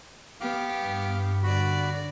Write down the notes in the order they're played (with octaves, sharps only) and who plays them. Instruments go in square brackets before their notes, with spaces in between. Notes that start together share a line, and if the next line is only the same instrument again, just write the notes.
[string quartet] B3 G4 [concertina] F5 D6 F6
[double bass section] G2
[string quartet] D3 D5 [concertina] F#4 B5